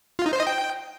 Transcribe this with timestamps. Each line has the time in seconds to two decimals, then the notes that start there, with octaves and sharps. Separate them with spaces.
0.19 F4
0.26 D#4
0.33 C5
0.40 D#5
0.47 G5